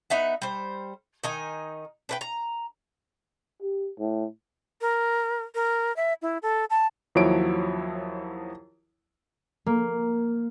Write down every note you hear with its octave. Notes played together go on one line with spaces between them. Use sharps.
B3 D#4 E5 F#5
G3 C5
D#3 D#4 G#5
D4 B4 G5
A#5
G4
A2
A#4
A#4
E5
E4
A4
A5
D#2 F3 F#3 E4 C#5 D7
A#3